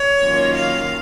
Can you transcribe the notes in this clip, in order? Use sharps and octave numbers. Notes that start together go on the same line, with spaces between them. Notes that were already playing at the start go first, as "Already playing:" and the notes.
Already playing: C#5
D#3 F#3 A#3 C#4 F4
F5